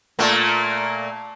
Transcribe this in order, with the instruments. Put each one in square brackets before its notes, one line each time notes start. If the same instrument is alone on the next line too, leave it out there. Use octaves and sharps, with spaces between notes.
[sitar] A#2 A3 A#3